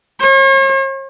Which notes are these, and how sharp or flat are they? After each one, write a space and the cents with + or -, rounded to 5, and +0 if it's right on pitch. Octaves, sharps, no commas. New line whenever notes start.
C#5 -45